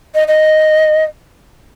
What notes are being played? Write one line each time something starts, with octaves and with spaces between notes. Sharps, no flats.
D#5
D#5